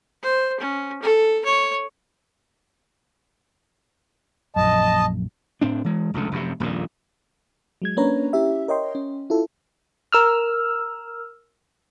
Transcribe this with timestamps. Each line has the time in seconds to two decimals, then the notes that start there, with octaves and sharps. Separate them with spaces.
0.23 C5
0.60 C#4
1.02 A4
1.45 C#5
4.56 A#1 F#2 D#5 A5
5.61 A2 C4 D4
5.84 E3 G#3
6.14 F1 C#2 B2 D3
6.32 F1 F#2 A2 C3
6.60 D#1 A#1 F2 A#2
7.82 F#3 G#3 G#6
7.97 A#3 C#4 D4 B4 C#5 A#5
8.33 C#4 E4 G4 E5
8.68 A#4 C#5 D#5 G5 C6
8.95 C#4
9.30 E4 F4 A4
10.12 A#4 E6 F6